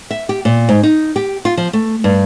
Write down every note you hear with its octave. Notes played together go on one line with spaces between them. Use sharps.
E5
G4
A#2
G#2
D#4
G4
F4
F3
A3
G2